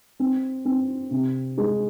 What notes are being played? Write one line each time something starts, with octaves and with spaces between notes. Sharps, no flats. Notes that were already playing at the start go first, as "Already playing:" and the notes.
C4
C4
C3
G#3